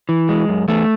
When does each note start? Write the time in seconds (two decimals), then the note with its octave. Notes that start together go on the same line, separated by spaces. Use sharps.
0.09 E3
0.29 G#3
0.48 F#2
0.68 E2 A3